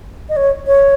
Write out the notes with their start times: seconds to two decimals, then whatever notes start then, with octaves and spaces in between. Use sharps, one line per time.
0.29 D#5
0.36 C#5
0.67 C#5